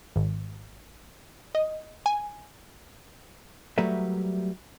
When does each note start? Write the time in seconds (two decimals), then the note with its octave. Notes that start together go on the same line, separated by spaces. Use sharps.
0.16 G#1
1.55 D#5
2.06 G#5
3.78 F#3 G3 A3 A#4 B4 E5